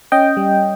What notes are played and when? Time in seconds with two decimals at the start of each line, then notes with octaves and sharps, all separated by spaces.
0.12 C#4 D#5 G5
0.37 G3